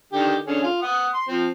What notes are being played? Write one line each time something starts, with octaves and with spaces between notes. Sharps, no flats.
D3 D#3 G4
D3 C#4 G#4
F4
F#5 D#6
C6
F3 C4